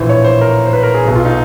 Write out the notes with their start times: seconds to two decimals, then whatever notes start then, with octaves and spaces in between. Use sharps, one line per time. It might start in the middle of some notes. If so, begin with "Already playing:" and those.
Already playing: A#1 A2 E3 C5
0.09 C#5
0.24 C5
0.41 A#4
0.66 C5
0.73 B4
0.83 A#4
0.94 G#4
1.05 B1 B2 F#3
1.15 F4
1.25 D#4